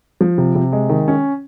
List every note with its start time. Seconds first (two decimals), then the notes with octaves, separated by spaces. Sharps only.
0.21 F3
0.38 C3
0.55 C3
0.72 G#3
0.89 D#3
1.08 C#4